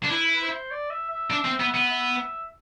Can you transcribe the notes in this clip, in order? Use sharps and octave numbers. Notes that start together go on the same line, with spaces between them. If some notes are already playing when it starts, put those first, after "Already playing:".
D4
E4 B4
B4
C5
D5
E5
E5
D4
C4
B3
B3
E5